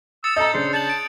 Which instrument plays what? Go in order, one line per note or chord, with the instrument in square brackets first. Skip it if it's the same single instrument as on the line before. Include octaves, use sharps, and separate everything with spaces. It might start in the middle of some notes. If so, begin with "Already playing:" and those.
[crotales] D#6 A6 C#7 [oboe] E6
[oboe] A4 [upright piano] D#5 A#5 [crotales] G6
[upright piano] C#3 D4 [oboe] C5
[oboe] A5 [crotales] F#6 G6 F#7
[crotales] D7 F#7